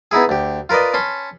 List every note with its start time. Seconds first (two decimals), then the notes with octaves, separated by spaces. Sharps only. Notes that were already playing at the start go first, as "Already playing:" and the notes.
0.11 B3 D#4 E4 G#4
0.29 D2 G4
0.69 F4 A#4 B4 D5 D#5
0.94 C#4 A5 B5 C6